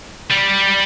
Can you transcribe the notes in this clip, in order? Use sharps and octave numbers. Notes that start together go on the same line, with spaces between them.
G3